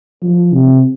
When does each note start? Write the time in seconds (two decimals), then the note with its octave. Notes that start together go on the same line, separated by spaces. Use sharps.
0.23 F3
0.54 C3